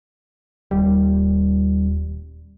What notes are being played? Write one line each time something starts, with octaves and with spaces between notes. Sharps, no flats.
D#1 G3